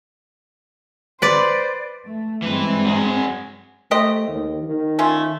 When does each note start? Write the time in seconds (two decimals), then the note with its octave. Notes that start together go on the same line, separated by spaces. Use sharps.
1.22 B4 C5 D5
2.07 A3
2.42 G2 E3 G#3 C4 B4
2.85 F#3 G#4
3.91 A3 G4 C5 D#5
4.28 D#2
4.63 D#3
4.99 A3 C#4 F4